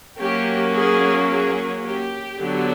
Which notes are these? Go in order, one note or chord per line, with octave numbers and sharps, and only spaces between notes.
F#3 A#3 C#4 G4
G#4
G#4
G4
D3 F#3 B3 D4